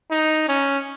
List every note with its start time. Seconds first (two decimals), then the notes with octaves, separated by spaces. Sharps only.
0.11 D#4
0.48 C#4